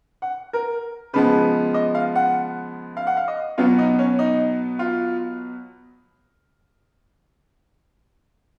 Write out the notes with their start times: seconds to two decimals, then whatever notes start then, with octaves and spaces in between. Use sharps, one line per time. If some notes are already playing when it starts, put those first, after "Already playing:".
0.22 F#5
0.53 A#4
1.13 C#3 F3 G#3 B3 B4
1.74 D#5
1.95 F5
2.16 F#5
2.97 F5
3.07 F#5
3.17 F5
3.28 D#5
3.58 B2 F#3 B3 F4
3.79 D#4
3.99 C#4
4.19 D#4
4.79 F4